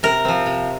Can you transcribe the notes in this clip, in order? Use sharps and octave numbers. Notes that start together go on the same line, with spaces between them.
C3 A#4
F3 C4
C3